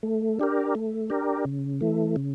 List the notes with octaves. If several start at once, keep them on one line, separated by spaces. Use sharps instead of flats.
A3
D4 G4 A#4
A3
D4 G4 A#4
C#3
E3 A3
C#3